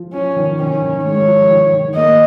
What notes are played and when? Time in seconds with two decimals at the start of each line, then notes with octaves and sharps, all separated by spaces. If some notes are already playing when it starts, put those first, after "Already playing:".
Already playing: F3
0.13 F3 C#4
0.36 D#3
0.59 D#3 C#4
0.82 D#3
1.05 G#3 C#5
1.27 F3
1.50 D#3
1.73 D#3
1.95 A#3 D#5